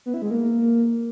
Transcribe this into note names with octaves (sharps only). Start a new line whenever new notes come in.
B3
E4
G#3
A#3